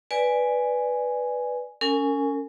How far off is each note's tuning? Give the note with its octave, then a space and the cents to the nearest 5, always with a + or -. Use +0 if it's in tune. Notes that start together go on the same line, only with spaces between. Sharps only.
B4 +0 D5 +0 G#5 +0
C#4 +15 A#4 -40 G#5 +0